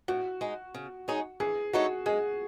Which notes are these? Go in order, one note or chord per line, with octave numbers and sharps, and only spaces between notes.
A2 F#4
G#3 D#4
C#3
G#3 D#4 G#4 C#5
E3 G#4
A3 D#4 F#4 A4 C#5
G#3 G#4